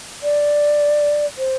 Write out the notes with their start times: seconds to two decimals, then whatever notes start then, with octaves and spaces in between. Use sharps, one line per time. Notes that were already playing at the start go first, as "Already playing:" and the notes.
0.23 D5
1.38 C5